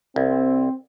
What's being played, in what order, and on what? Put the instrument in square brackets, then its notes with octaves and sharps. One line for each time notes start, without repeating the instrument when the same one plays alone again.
[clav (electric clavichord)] C2 [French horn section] C4